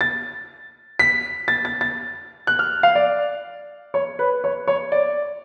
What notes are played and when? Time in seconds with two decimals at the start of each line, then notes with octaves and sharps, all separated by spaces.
0.01 A6
0.99 B6
1.48 A6
1.65 A6
1.81 A6
2.47 F#6
2.59 F6
2.83 F5
2.95 D5
3.94 C#5
4.19 B4
4.44 C#5
4.68 C#5
4.92 D5